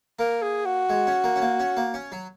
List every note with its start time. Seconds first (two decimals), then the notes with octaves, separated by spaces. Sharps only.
0.19 A#3 A#4
0.43 G#4
0.66 F#4
0.90 G#3
1.07 C#4
1.24 A#3
1.36 C#4
1.42 A#3
1.60 C#4
1.77 A#3
1.94 C#4
2.12 F#3